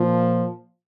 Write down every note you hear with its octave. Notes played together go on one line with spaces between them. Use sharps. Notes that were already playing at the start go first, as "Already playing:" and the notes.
Already playing: A#2 F3